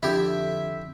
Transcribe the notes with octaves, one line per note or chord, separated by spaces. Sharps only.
F2 D3 E4 G4 E5